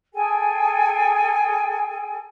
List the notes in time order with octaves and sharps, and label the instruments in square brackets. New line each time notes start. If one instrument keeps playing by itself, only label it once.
[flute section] G#4 A4 G5 G#5